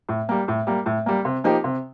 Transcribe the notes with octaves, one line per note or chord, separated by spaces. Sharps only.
A2
G3 A#3
A2
G3 A#3
A2
G3 A#3
C3
F3 A#3 D#4 G4
C3